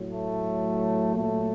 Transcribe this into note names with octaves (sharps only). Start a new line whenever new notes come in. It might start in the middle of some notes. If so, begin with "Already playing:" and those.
Already playing: A2 F#3
A3
A#2 F#3 A3